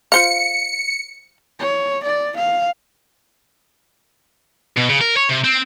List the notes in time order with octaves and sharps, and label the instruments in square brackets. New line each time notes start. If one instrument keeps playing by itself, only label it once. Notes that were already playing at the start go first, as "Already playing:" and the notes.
[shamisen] F4 C5 F5 [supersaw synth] C#7
[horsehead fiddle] C#5
D5
F5
[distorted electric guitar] B2
C#3
A#4
C#5
C3
C4